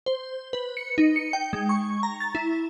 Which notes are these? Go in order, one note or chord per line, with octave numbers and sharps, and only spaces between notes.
C5
B4
C#7
D#4
C#7
G5
G#3
C#6
A#5
A6
E4